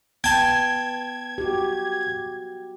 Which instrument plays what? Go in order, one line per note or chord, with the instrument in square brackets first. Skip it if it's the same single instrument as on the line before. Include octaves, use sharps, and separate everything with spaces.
[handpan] B3 [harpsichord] G5 A5 [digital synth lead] G#6
[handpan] F#4 G4